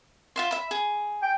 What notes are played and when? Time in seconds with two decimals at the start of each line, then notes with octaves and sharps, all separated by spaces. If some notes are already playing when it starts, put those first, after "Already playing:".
0.36 F4 E5 C6
0.51 E5 B5
0.71 G#4
1.23 G5